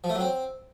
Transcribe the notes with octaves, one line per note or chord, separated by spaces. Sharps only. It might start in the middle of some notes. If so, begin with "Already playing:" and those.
F3
A3
F#3
C4